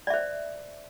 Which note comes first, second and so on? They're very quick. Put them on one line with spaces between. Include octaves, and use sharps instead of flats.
D5 E5 C5